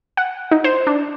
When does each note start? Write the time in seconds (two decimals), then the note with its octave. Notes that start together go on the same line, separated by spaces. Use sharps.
0.17 F#5
0.51 D#4
0.64 C5
0.87 D4